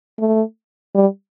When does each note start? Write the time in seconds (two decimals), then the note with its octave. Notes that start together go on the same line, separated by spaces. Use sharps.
0.19 A3
0.95 G3